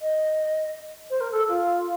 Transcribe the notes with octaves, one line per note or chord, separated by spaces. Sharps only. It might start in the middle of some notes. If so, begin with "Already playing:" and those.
D#5
C5
A#4
A4
F4